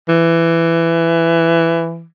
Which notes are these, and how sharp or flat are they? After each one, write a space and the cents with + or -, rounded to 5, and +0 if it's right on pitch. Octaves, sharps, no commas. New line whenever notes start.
E3 +15